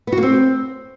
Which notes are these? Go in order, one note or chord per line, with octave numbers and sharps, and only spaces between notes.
B3
F#4
A#3
C4